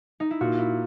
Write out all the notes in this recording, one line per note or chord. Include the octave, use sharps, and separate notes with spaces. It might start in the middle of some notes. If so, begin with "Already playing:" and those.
D#4
E4
A#2 F#4
E4